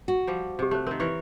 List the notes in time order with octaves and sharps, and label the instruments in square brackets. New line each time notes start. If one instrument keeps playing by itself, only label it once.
[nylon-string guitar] F#4
[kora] F3 G3
[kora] C3 [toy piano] G4 D#5
[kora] A3 [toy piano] G4 C5
[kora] D#3 C4 [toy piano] A#4
[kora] E3 A#4 C#5 [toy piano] C#6